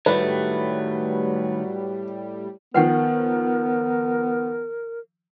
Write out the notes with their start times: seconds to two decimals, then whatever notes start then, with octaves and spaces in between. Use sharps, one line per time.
0.06 A2 D#3 F#3 G3 A3 B4
2.74 D#3 F3 B3 A#4 B4 F#5 G5